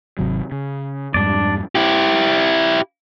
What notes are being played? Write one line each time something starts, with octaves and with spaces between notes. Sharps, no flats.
G#1 C3 F#3
C#3
F2 G#2 G3 D4 D5
E4 G4